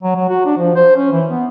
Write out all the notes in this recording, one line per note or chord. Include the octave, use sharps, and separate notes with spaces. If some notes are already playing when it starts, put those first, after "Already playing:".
F#3
F#3
F#4
D4
F3
C5
C#4
E3
B3